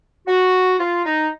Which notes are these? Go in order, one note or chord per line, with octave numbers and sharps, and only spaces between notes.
F#4
F4
D#4